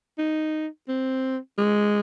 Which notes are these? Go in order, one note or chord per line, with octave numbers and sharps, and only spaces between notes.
D#4
C4
G#3